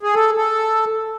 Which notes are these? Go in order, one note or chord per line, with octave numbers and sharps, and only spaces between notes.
G#4
A4
A4